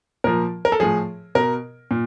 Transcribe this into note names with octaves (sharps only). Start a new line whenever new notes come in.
A#2 F3 A#4
A#4
A4
A2 F3 G#4
B2 A#4
A#2